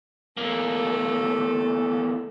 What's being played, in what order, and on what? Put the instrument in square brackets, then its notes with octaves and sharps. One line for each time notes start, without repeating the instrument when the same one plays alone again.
[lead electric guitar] E2 A#3 [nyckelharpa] A3 A4